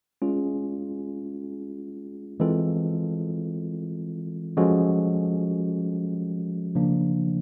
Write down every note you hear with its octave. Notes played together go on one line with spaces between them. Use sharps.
G#3 C#4 F4 G#4
E3 G#3 C4 F4 A4
F3 G#3 C#4 F#4 A4
C#3 F3 A#3 D4